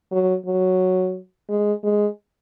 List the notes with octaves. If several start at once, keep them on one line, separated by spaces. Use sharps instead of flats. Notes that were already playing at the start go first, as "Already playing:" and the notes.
F#3
F#3
G#3
G#3